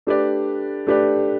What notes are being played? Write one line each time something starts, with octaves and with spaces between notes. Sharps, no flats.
A3 D4 G4 B4 D5
A3 D4 G4 B4 D5